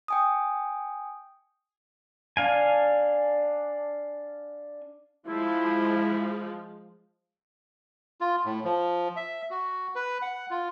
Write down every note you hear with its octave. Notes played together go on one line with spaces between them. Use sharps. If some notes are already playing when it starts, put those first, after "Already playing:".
G5 G#5 D#6
D4 F5 G#5
F3 G#3 E4
F4
A2
F3
E5
F#4
B4
F#5
F4